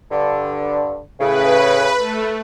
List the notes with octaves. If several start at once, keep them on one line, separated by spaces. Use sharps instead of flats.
G2 D3
A2 C#3 B4
A3